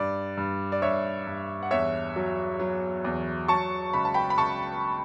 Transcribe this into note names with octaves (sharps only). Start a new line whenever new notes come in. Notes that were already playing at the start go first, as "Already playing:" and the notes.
Already playing: G2 D5
G2
D5
G2 C#5 E5
G2
F#5
E2 C#5 E5
F#3
F#3
E2
F#3 A5 C#6
C#2 B5
A5
G5 B5
B5
C#2 A5 C#6